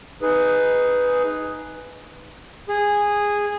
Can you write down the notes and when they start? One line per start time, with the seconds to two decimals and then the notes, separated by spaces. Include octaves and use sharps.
0.22 D#4 G#4 B4
2.69 G#4